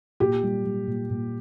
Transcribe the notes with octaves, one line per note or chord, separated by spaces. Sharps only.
A#2 G4
G3
G3
A#2
A#2